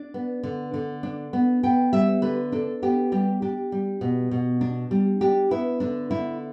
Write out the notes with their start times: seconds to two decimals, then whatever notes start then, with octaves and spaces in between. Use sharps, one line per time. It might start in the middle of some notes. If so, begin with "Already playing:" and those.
Already playing: D4 D5
0.14 B3
0.43 D3
0.74 D3
1.03 D4
1.33 B3
1.63 B3 G5
1.93 G3 E5
2.22 D3 B4
2.52 D4 A4
2.82 B3 G4
3.12 G3 G4
3.42 D4 G4
3.72 G3
4.01 B2
4.31 B2
4.61 D4
4.91 G3
5.21 D4 G4
5.51 B3 E4
5.80 D3 D4
6.11 D3 E4